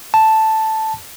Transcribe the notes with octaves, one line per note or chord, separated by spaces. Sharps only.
A5